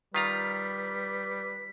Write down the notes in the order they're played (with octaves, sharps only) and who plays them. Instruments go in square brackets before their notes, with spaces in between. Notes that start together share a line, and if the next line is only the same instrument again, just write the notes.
[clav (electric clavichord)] D#3 F4 A#5 [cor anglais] G3 [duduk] B4 [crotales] B6